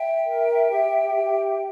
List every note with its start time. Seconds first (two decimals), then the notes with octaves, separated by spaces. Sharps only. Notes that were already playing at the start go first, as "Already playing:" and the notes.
Already playing: E5 G5
0.26 A#4
0.71 G4
1.14 G4